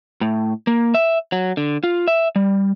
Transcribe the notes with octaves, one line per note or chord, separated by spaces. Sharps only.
A2
A#3
E5
F#3
D3
F4
E5
G3